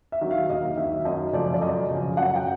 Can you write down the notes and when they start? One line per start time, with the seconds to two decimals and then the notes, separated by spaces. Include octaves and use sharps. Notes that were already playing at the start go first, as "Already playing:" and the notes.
0.12 E5
0.21 D#3 F#3
0.31 F5
0.50 D#2 D#5
0.77 D#3 F#3 E5
1.05 F#2 D#5
1.33 C#3 F3 A3 D5
1.54 D5
1.61 F#2 D#5
1.90 C#3 F3 A3
2.17 F#2 F#5
2.35 G5